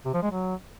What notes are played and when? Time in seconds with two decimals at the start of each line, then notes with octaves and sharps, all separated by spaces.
0.05 C3
0.14 F3
0.23 G#3
0.31 F#3